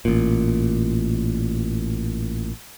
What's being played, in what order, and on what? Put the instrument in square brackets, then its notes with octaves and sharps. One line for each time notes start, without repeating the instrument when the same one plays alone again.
[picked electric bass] A1 A#2